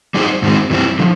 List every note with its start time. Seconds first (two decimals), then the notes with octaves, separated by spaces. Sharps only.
0.14 G3 C4 D#4 G#4 C5
0.42 G#2 D#3 G#3 C4
0.70 G2 E3 G3 C4
0.99 D3 F3